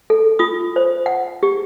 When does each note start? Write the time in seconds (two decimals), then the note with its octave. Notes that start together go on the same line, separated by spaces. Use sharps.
0.10 A4
0.39 F4 D#6
0.76 C5
1.06 F#5
1.43 G4